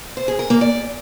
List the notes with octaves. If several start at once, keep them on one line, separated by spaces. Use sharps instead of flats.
C5
G#4
A#4
A#3
D5